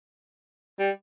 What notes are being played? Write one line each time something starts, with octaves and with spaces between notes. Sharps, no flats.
G3